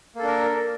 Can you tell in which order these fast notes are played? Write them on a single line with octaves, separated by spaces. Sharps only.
A#3 A4 D4 A#4